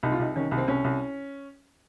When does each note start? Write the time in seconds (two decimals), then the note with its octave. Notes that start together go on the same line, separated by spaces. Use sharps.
0.03 C2 D#4
0.12 F4
0.19 C2 D#4
0.36 D#3 C#4
0.51 C2
0.58 C4
0.68 C2 C#4
0.84 C2